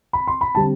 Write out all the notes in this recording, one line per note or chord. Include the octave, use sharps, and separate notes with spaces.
B5
C6
B5
D3 G3 C4 A5